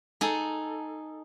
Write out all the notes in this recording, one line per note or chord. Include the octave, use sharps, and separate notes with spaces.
D#4 G#4 A4